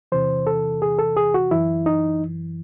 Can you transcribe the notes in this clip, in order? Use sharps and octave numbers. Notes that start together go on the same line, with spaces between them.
E2 C3 E3 C5
A4
G#4
A4
G#4
F#4
F#2 E3 E4
D#4